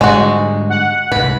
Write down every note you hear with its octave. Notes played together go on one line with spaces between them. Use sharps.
G#2 D3 G3 G#3 F#4
F#5
C2 G#2 B4